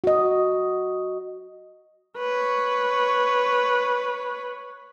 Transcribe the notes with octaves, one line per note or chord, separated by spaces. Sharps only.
F#4 D#5
B4 C#5